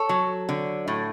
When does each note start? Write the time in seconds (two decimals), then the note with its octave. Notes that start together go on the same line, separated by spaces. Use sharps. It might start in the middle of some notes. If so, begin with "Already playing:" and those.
Already playing: A4 C#5
0.09 F#3
0.49 D3
0.88 A2